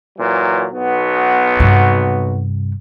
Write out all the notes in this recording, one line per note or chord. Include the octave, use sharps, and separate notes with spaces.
A#2 E3 F#3
B1 B3 F#4
G2 C3